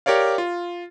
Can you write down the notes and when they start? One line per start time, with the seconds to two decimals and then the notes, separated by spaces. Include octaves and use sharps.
0.06 G4 A#4 C#5 D5 F5
0.38 F4